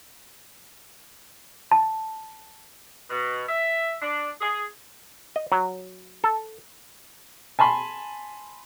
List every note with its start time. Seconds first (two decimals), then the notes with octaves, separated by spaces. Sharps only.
1.71 A5
3.10 B2
3.49 E5
4.01 D4
4.41 G#4
5.36 D#5
5.52 F#3
6.24 A4
7.59 G#5 A5 B5 C6